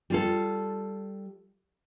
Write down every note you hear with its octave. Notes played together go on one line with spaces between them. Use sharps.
G3 F4 A4